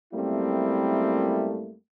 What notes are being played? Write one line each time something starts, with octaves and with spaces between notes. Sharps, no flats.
F#2 G3 A3 A#3 C4 E4